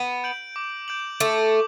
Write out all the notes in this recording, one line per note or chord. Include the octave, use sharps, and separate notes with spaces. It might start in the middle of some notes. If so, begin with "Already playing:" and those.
Already playing: B3
G6 D7 F#7
D6
G6 D7 F#7
A3 D6